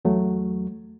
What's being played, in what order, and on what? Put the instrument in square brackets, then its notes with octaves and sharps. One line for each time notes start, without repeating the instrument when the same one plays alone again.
[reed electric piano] E2 F#3 A3